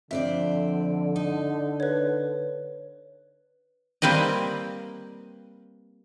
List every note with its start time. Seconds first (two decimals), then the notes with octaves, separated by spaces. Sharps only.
0.11 F2 D3 C4 D5 E5
1.16 D#4
1.80 B4 C#5
4.02 G3 A#3 C4 B4 D#5